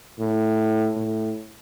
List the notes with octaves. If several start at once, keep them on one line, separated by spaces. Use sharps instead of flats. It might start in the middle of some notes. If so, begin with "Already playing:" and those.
A2
A2